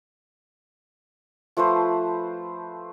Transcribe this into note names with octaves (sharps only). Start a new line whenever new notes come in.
F3 A3 B4 C5